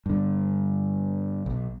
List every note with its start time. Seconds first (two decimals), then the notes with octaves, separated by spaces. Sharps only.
0.06 G2 D3
1.46 B1